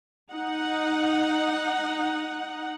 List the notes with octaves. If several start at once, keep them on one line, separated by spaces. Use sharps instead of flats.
D#4 F#5